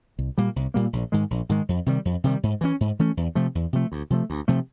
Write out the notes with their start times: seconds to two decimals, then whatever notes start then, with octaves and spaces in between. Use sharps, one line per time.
0.19 C2
0.38 A#2 G3 A#3
0.56 C2
0.74 A#2 G3 A#3
0.93 A#1
1.12 G#2 D#3 G#3
1.30 A#1
1.49 G#2 D#3 G#3
1.69 F2
1.86 C3 D#3 G3
2.05 F2
2.24 C3 D#3 G3
2.43 G#2
2.61 E3 A3 C#4
2.81 G#2
2.99 E3 A3 C#4
3.17 E2
3.35 C3 F3 A3
3.55 E2
3.73 C3 F3 A3
3.92 D2
4.10 C3 F3 A3
4.30 D2
4.48 C3 F3 A3